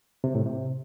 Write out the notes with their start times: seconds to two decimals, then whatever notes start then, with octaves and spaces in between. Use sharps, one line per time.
0.24 C3
0.35 A2
0.46 C3